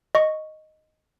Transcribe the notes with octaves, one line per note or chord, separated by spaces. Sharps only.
D#5 C#6